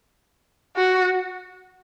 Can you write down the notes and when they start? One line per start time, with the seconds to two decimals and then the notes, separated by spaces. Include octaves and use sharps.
0.76 F#4